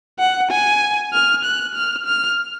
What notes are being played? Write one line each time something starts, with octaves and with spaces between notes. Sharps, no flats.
F#5
G#5
F6
F#6
F6
F6